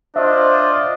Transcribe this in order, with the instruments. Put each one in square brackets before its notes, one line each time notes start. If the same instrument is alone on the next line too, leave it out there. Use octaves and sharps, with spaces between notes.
[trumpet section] D4 F4 D#5 [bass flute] C5 [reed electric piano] E5